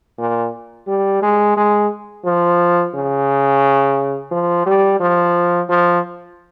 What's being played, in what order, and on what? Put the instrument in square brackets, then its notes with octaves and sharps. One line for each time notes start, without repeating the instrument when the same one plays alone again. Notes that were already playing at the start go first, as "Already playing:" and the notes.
[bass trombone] A#2
G3
G#3
G#3
F3
C#3
F3
G3
F3
F3